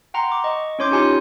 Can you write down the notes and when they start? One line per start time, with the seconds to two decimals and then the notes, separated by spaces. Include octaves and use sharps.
0.14 F#5 G5 A#5 C6
0.32 D6
0.44 D#5 C#6
0.79 C#4 E4 C#5 C6 D6 G6
0.91 D#4 F4 G4 G#5 C6
1.03 G#5